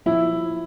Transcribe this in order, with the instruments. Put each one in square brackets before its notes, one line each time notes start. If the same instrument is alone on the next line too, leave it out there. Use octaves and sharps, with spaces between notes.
[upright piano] F3 E4